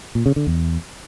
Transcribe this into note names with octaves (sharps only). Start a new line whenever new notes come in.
A#2
C#3
D3
E2